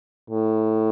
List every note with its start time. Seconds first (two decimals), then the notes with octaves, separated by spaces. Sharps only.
0.30 A2